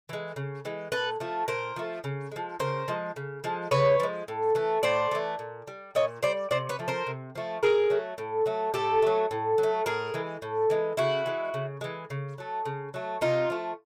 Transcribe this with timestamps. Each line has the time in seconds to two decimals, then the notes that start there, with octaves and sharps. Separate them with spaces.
0.09 E3 G#3
0.36 C#3
0.65 E3 G#3
0.92 A#2 A4 B4
1.20 F3 A3
1.48 A#2 A#4 C5
1.76 F3 A3
2.04 C#3
2.31 F3 G#3
2.60 C#3 A#4 C5
2.88 F3 G#3
3.16 C#3
3.44 F3 G#3
3.71 C#3 B4 C#5
4.00 F3 G#3
4.28 A2
4.55 E3 A3
4.83 A2 C5 D5
5.11 E3 A3
5.39 A#2
5.67 G3
5.95 A#2 C#5 D#5
6.23 G3 C5 D5
6.51 C3 C5 D5
6.69 B4 C#5
6.79 F3 A3
6.88 A#4 C5
7.07 C3
7.35 F3 A3
7.63 A2 G#4 A#4
7.90 F#3 A3
8.18 A2
8.46 F#3 A3
8.74 A2 G4 A4
9.02 F#3 A3
9.31 A2
9.58 F#3
9.63 A3
9.86 A2 G#4 A#4
10.14 E3 G#3
10.42 A2
10.70 E3 G#3
10.97 C#3 E4 F#4
11.26 E3 G#3
11.54 C#3
11.81 E3 G#3
12.10 C#3
12.38 F#3 A3
12.65 C#3
12.94 F#3 A3
13.21 C3 D#4 F4
13.50 F3 A3